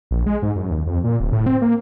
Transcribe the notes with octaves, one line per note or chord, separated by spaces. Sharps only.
A#1
G#3
G#2
F#2
D#2
F2
A#2
D1
A2
C4
A#3